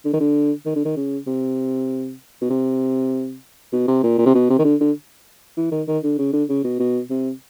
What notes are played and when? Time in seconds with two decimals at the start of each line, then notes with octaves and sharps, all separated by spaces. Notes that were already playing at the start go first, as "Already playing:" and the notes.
0.05 D3
0.13 D#3
0.20 D3
0.66 D#3
0.76 D3
0.85 D#3
0.97 C#3
1.27 C3
2.41 B2
2.50 C3
3.73 B2
3.88 C3
4.03 A#2
4.18 A#2
4.26 C3
4.35 B2
4.50 C3
4.59 D#3
4.65 D3
4.81 D3
5.57 E3
5.71 D#3
5.88 D#3
6.03 D3
6.19 C#3
6.33 D3
6.49 C#3
6.64 B2
6.79 B2
7.10 C3